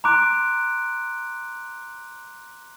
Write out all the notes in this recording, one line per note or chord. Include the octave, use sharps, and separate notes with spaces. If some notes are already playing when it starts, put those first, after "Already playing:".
A#5 C6 D6 F#6 D7